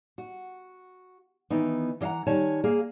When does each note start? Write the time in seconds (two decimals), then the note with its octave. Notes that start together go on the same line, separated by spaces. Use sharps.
0.18 F#4
1.50 D#3 E3 B3 D#4
2.01 E3 D#5 F5 F#5 A#5
2.27 D#3 G3 C#5 G#5 A5
2.64 A#3 G#4 F5